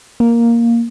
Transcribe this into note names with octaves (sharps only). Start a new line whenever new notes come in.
A#3